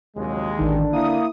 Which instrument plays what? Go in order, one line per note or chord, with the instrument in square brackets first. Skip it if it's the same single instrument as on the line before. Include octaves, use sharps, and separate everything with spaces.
[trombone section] A#1 C3 F#3 [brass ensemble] D#2 G#3
[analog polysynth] A1 D#3 [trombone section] D3 D4
[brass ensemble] A#3 [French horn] E4 [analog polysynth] D#6